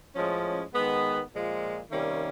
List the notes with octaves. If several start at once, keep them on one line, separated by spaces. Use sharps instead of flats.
A2 F3 G#3 C#4
D#3 G#3 B3
A#2 F3 G#3
C3 D#3 G3 A#3 C#4